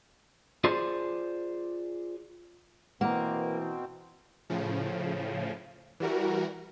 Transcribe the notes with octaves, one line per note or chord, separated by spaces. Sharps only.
F4 G#4 C5 D5 C6
B2 E3 A#3 C4 F#5 A#5
A2 C#3 F3
E3 G3 F#4 A#4